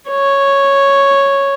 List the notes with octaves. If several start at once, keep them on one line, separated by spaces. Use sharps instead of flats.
C#5